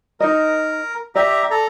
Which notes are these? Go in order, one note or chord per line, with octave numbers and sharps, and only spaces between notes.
D#4 A#4 D#5
G4 D5 E5 A#5
A4 A#5